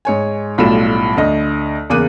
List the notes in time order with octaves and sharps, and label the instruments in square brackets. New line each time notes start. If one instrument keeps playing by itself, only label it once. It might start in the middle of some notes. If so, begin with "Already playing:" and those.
[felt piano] G#2 C#5 G#5
B1 A2 G3 F4 F#4 E7
D2 D#5
E2 C#3 A#3 D6 F#6 D#7